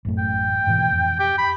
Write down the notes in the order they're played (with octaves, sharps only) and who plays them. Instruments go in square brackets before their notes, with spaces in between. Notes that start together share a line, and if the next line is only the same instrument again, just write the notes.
[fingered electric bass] A1 F#2 A3
[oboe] G5
[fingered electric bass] G#2 B2 E3
F2
[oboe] G4
B5